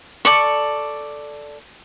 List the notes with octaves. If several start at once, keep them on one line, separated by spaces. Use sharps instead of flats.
A4 D5 C#6